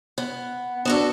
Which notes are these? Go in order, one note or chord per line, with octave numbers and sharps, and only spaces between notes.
B3
B3 D4 F#4 A4